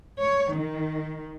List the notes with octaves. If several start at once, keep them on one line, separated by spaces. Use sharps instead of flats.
C#5
D#3